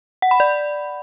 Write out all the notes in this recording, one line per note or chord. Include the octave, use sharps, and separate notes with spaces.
F#5
B5
D5